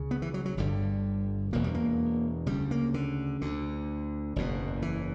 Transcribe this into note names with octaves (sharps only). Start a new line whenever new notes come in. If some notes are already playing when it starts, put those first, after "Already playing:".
Already playing: C#2 C#3
B3
E3
F#3
F#3
G1 G2 D3 G3
E1 E2 B2 A#3
G3
A#3
D2 C#3 G3
A#3
D3
D2 D3
F#1 E2 B2
E3